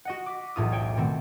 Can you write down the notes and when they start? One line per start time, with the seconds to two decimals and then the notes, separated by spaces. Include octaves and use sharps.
0.05 F#4 D#5 F#5
0.26 D6 B6
0.56 E1 B1 A2 F4 D#6
0.72 C#5 G5 D7
0.97 B2 D#3 A3 C4